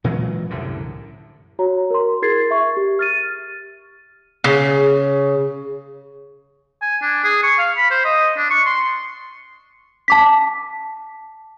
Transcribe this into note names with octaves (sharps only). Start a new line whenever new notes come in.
A#2 E3 F#3 G#3
C2 F#2 A2 D3
F#4 C#5 A#5
A#4 C6
E4 G#4 A#4 G#6 A6 C7
E5 C#6
G4
F6 A6 D#7
C#3
G#5
D4
G#4
C#6
F5
B5
C5
D#5
D4
C#6
C6
A5 D6 B6